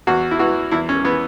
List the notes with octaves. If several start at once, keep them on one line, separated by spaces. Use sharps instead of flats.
E2 F#4
E4
E3 F#4
E2 E4
C#4
E3 B3